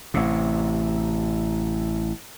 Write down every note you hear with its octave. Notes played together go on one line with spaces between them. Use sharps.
A1 C3